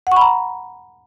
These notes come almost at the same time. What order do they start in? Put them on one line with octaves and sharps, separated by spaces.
F#5 C#6 B5 A#5